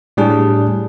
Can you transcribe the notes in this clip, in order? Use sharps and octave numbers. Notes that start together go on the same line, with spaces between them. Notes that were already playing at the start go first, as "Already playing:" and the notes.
A2 G3 D4 G#4